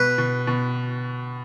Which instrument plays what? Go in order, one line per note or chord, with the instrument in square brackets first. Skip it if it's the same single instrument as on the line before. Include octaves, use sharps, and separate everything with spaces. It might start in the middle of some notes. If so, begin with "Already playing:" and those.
Already playing: [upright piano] B2 [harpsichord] B4
[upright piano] B2
B2